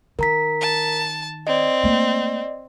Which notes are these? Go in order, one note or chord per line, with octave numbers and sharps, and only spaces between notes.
D#3 A#4 A#5 B6
A5
C4 D5 D#5
A3 A#3